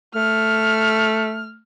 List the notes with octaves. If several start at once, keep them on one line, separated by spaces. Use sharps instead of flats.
A3 F6